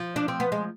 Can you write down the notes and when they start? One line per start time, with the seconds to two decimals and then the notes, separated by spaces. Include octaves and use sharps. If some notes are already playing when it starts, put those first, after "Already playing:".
Already playing: F3
0.16 D4
0.28 C4
0.40 B3
0.52 G#3